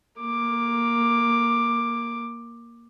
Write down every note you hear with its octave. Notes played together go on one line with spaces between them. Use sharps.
A#3 D6